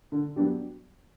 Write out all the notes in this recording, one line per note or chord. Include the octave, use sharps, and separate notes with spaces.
D3
F#3 B3 D4 G4